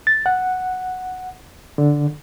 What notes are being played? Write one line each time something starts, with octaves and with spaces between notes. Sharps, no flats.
A6
F#5
D3